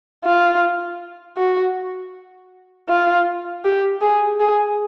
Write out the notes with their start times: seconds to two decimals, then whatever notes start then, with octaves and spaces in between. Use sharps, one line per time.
0.24 F4
1.37 F#4
2.89 F4
3.65 G4
4.01 G#4
4.40 G#4